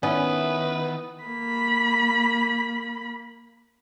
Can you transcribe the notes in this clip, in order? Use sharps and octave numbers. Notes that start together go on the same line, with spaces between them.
D#3 B3 C#4 E4 B4
A#3 B5